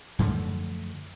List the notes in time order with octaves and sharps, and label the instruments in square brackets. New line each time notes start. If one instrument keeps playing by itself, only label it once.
[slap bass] F#2 D3 F3 A3